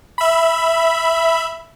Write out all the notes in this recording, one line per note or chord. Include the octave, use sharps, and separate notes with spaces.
E5 B5